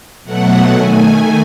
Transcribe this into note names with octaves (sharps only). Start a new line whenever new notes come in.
B2 F#3 A3 F#5
D#3 A3 G#5